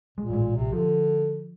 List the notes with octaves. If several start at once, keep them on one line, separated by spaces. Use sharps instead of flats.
A#2 G#3
A1 G#3
A#1 C3
D3 F3